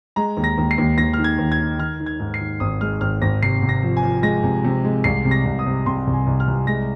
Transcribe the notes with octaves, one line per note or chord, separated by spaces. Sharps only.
G#3 A#5
D#2
A#6
D#2
C7
D#2
D#2 A#6
D#3 F6
G#6
D#2
G#6
D#3
D#3 F6
D#3
G#6
G#2
C7
D#3
G#1 D#6
G#3 F6
G#1 F6
G#1 A#6
C3 C7
C3
A#6
F3
G#5
F3
G#3 A#6
C3
C3
G#3
C2 C7
C3
A#6
C2
D#6
C3
C3 C6
C2
G#5
C2
F6
C2
G#3 A#6